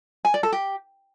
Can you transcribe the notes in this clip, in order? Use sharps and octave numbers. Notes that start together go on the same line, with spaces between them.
G#5
D5
A4
G4